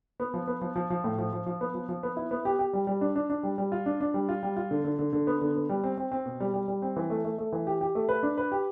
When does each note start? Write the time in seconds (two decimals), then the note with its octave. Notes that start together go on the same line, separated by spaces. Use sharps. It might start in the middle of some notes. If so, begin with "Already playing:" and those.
0.20 B3
0.34 F3
0.47 B3
0.61 F3
0.76 F3
0.90 F3
1.04 A2
1.18 F3
1.33 F3
1.46 F3
1.61 B3
1.75 F3
1.89 F3
2.03 B3
2.17 E4
2.31 B3
2.45 G4
2.59 G4
2.73 G3
2.87 G3
3.01 D4
3.16 D4
3.30 D4
3.43 G3
3.58 G3
3.72 F4
3.86 D4
4.00 D4
4.14 G3
4.29 F4
4.43 G3
4.57 F4
4.71 D3
4.84 D3
4.99 D3
5.13 D3
5.27 B3
5.41 D3
5.55 B3
5.69 G3
5.84 C4
5.98 C4
6.12 C4
6.26 B2
6.40 G3
6.54 G3
6.68 G3
6.82 C4
6.96 E3
7.10 A3
7.25 A3
7.38 A3
7.52 E3
7.67 G4
7.81 G4
7.95 A3
8.09 B4
8.23 D4
8.38 B4
8.52 G4